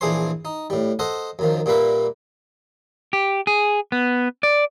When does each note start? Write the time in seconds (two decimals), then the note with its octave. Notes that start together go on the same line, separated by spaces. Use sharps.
0.01 A#1 E3 D4 G#4 C5 C6
0.45 D#4
0.70 A2 G3
0.99 A4 C5 D#5 F#5
1.39 F#2 D#3 F3
1.66 A#2 G3 A#3 B4 E5
3.13 G4
3.47 G#4
3.92 B3
4.43 D5